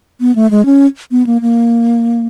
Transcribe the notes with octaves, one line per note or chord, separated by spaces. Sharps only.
B3
A3
G#3
C#4
B3
A#3
A#3